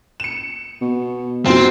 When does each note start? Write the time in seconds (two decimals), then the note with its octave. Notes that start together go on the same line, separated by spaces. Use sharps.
0.20 C#7 E7
0.81 B2
1.46 F#2 B2 F#3 C4